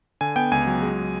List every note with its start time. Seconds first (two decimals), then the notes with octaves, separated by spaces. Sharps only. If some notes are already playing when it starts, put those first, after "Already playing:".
0.21 D3 G#5
0.36 B3 G5
0.51 C#2 G#5
0.67 F#3
0.82 G#3